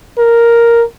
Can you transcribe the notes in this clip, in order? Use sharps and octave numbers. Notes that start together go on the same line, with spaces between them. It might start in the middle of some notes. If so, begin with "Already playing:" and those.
A#4